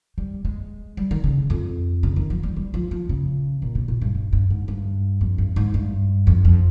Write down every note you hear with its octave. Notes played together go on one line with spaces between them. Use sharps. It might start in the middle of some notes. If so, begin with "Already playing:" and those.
G3
G#3
G3
D#3
C#3
F2
C#3
D#3
F3
G3
G3
F3
F3
C#3
A#2
C3
A#2
G2
G2
G2
G#2
G2
F2
G2
G#2
G2
F2
F2